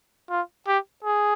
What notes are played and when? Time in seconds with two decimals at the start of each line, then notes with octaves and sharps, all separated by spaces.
0.30 F4
0.67 G4
1.04 G#4